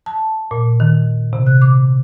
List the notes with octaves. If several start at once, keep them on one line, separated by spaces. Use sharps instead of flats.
A5
A#2
D#3
C3
F#6
D6